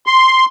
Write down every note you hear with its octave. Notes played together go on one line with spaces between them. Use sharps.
C6